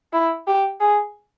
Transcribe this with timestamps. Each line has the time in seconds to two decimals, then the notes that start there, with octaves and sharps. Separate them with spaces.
0.13 E4
0.47 G4
0.80 G#4